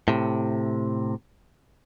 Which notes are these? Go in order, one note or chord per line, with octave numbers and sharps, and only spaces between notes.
A2 C3